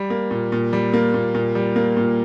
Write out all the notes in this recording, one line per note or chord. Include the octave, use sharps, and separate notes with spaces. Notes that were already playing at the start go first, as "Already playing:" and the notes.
Already playing: G3
A#3
A#2
A#2
G3
A#3
A#2
A#2
G3
A#3
A#2